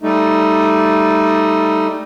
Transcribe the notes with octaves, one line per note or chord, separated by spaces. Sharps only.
G3 A3 D#4